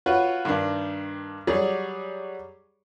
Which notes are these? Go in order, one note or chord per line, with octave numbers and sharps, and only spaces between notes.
F4 F#4 B4 C#5
G2 D#3 D4
F#3 G3 G#4 C#5 D5